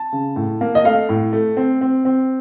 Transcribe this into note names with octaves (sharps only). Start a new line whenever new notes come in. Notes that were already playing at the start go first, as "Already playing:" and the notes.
Already playing: A5
C#3
A2
A#3
D#5
A3 F5
A2
A3
C4
C4
C4